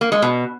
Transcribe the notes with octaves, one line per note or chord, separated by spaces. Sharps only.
A#3
G#3
B2